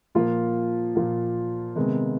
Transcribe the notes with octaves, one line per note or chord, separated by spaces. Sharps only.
A#2 F3 A#3 F4
A#2 F3 A#3
C3 D#3 G#3 B3